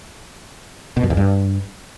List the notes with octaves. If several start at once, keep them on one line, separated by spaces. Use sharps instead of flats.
B2
F#2
E2
G2